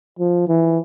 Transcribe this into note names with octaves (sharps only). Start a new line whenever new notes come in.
F3
E3